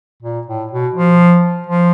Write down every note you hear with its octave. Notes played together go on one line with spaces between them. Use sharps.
A#2
A2
B2
F3
F3